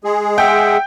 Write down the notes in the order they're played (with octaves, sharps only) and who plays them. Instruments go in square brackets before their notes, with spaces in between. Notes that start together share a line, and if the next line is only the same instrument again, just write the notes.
[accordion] G#3 G#4
[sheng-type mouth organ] E5 F#5 [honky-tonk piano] G5